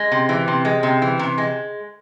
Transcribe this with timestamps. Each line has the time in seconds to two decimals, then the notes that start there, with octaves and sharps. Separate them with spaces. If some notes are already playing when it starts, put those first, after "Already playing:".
Already playing: G#3
0.12 C3
0.29 E3
0.48 C3
0.65 G#3
0.83 C3
1.02 E3
1.19 C3
1.38 G#3